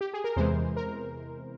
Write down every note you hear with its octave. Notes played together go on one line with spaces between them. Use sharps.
G4
G#4
A#4
E2 C3 E3 G#3 C5
A#4